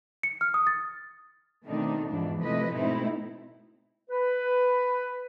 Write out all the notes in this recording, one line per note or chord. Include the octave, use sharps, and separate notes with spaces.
C#7
F6
D#6
A6
B2 D#3 A3 C4 D4 D#4
E2 G#2 B2 E3 F3 D4
C3 F3 A3 E4 B4 D#5
G#2 B2 A3 C4 D#4 E4
B4